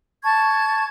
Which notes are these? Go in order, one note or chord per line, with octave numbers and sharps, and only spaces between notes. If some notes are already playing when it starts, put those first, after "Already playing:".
A5 C#6 G#6